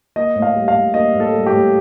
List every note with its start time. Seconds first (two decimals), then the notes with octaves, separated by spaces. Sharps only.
0.16 A#3 D#5
0.36 A2
0.42 F5
0.56 G3
0.68 F5
0.74 A2
0.94 A#3 D#5
1.14 A2
1.20 A4
1.33 G3
1.46 G4
1.52 A2